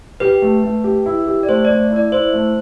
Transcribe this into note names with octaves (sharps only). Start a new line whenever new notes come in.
G4 B4
A3
A3
G4
E4
G4
D5
A3 C5
D5
A3
E4
D5
E4 C5
A3